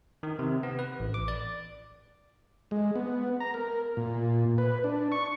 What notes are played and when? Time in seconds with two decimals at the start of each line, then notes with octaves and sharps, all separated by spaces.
0.23 D#3
0.39 C3
0.63 B3
0.79 B4
1.00 A1
1.14 D6
1.28 D5
2.71 G#3
2.96 B3
3.40 A#5
3.54 A#4
3.97 A#2
4.58 B4
4.84 D4
5.12 C#6